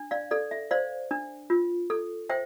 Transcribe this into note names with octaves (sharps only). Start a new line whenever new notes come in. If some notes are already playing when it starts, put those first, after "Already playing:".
Already playing: D4
D5 F5
A4 D5
E5
C5 D5 F5
D4
F4
A4
C5 E5 G5